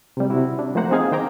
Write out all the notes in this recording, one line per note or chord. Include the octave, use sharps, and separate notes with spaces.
C3 G3
C3 E4 F#4
D4
F3 A3 A#3 C5 F#5 A#5
C4 D#4 G#4 F5 G#5
D#3 C5 G5 A#5 D6